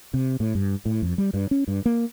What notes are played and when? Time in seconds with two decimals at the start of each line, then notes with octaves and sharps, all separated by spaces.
0.14 C3
0.40 A2
0.55 G2
0.85 A2
1.02 F2
1.18 G3
1.34 G2
1.51 C#4
1.68 G2
1.86 A#3